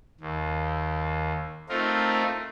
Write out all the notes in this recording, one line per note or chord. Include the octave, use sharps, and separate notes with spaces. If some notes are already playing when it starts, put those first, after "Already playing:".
D#2
A3 C4 D#4 F4 A#4